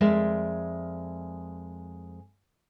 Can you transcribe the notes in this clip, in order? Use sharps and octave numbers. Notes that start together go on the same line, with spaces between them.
F2 G#3 A#4 D5 E5